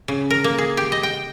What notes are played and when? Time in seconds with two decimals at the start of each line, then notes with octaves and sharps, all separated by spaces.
0.08 C#3
0.30 A#4
0.44 A#3
0.58 G#4
0.77 G4
0.92 D#5
1.03 G5